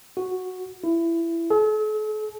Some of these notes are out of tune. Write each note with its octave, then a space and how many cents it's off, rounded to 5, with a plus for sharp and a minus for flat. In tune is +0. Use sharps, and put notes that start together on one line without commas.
F#4 -5
E4 +20
A4 -45